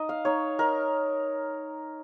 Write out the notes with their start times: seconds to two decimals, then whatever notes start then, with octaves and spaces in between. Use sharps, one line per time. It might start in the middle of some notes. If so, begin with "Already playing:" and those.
Already playing: D#4 D#5
0.09 F5
0.25 D#4 C#5
0.59 D#4 A#4